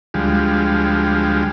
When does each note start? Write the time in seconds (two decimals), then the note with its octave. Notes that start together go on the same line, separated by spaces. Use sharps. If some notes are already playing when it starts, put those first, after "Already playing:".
0.14 D2 F3 G3 G#3